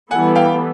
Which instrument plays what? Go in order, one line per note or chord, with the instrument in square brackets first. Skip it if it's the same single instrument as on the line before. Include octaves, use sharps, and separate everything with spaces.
[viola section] E3 G3 B3 E4 A4 [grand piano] F#5 G#5
[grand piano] F5 G5